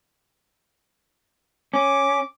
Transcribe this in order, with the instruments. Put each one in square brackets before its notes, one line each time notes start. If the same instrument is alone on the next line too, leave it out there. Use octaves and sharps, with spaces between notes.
[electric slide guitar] C#4 [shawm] D6